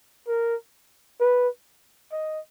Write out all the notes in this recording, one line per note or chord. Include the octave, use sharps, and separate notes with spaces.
A#4
B4
D#5